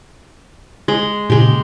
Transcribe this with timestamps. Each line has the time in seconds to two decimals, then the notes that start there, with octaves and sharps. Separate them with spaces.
0.88 G#3
1.30 A#2 C#3 G#3 G4